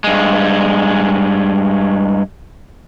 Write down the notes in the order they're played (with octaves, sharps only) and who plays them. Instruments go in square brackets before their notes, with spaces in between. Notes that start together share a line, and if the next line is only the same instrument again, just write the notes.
[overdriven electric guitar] G2 G#3